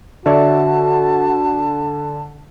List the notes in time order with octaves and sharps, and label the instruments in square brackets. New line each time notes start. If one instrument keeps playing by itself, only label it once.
[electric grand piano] D3 [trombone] F#4 [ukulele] C#5 D5 E5 [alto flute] A5